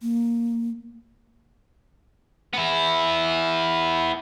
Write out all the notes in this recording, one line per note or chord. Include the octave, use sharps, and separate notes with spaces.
A#3
B3 E4